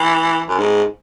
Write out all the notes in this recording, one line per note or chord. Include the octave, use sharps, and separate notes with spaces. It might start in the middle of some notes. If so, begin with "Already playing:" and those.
Already playing: E3
F#2
G#2